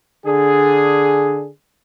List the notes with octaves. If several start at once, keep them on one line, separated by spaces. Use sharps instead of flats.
D3 D4 G#4